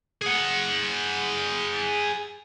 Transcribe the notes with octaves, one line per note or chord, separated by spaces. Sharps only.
G#4 F#5